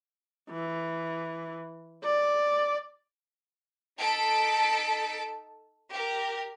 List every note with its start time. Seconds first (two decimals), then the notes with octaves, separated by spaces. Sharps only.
0.50 E3
2.04 D5
3.99 D#4 A4 A5 B6 D7
5.91 G4 A#4